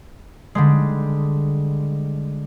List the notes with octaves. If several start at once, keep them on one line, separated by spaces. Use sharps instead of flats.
D3 G3 G#3